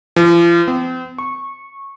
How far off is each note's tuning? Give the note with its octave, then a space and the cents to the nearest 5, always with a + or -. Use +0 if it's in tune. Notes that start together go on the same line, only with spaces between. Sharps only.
F3 -40
C4 -40
C#6 -15